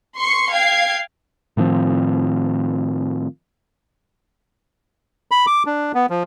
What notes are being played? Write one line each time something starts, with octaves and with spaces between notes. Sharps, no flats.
C6 C#6 C7 C#7
F5 G5 G#6 C7
A2 D#3 F3 C4
B5
D6
D4
B3
F3